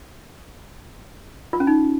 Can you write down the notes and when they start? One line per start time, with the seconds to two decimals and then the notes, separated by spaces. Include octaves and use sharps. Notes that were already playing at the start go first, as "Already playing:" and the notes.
1.53 F4
1.60 C#4
1.67 D#4